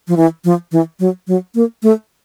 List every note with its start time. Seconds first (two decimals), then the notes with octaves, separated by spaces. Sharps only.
0.08 F3
0.17 E3
0.44 F3
0.72 E3
0.99 F#3
1.27 F#3
1.55 A#3
1.83 A3